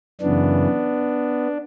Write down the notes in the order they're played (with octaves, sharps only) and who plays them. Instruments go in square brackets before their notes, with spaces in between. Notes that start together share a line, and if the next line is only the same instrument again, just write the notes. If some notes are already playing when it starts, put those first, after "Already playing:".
[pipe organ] F#2 C#3 E3 B3 D4